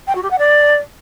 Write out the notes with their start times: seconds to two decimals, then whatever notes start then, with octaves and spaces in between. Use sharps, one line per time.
0.07 G5
0.15 F#4
0.23 G4
0.30 F#5
0.38 D5